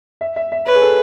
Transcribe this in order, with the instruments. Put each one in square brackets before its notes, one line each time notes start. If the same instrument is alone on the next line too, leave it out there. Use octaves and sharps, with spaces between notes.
[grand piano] E5
E5
E5
[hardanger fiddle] B4 [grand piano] C#5
[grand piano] G#4
A4